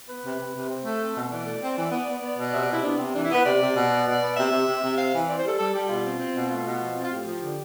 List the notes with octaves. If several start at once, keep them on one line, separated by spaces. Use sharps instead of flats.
B3 B4
C3
C3
C3
C4
A3
C4
B2
E3 D5
A3
C4
E3
B3
B3
B3
B2
C3 E5
D5
C3 E4
B3 D4
C3 C4
E3 D4
E4
B3 B4
C3 D5
C3
B2
B3
B2
B3
C3 E5
C3
C3
C3
C4 F5
E3
C4 D5
C5
G3 A4
G3 A4
G3 G4
B2 F4
C4
C4
B2
A3 F4
B2
F3
C4
F4
A2 G4
F3
D3